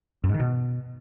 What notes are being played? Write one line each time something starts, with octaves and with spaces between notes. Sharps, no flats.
F#2
G#2
D#3
B2